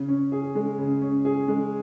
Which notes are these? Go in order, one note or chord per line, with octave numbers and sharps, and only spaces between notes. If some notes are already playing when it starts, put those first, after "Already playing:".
Already playing: C#3
C#4
G#4
G#3
C#3
C#4
G#4
G#3